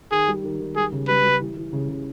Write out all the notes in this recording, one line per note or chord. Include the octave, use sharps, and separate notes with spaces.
D#3 G#4
G3
D#3
D#3
G3 G#4
C#3
G3 B4
G3
E3
E3
C#3
C#3